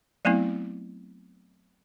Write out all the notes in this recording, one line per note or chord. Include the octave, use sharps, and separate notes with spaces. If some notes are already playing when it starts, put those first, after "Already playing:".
F#3 A3 B3 C4 E4